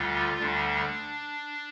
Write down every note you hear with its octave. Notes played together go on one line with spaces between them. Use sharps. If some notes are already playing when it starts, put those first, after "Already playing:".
Already playing: D2 D3 G3 F4
D2 D3 G3 D4